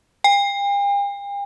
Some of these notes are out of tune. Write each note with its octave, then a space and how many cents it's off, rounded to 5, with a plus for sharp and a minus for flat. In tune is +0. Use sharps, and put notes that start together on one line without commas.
G5 +45